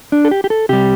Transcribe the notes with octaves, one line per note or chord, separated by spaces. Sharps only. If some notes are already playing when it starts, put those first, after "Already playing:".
D4
A4
G4
G4
A4
C3 G3 G4